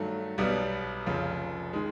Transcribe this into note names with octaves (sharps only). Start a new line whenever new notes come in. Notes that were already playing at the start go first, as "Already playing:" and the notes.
Already playing: G2 D#3 F#3 A3
B1 B2 G3 B3
F1 F2 C#3
D#3 G#3